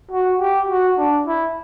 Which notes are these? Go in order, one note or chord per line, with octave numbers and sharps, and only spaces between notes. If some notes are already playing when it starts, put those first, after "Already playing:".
F#4
G4
F#4
D4
E4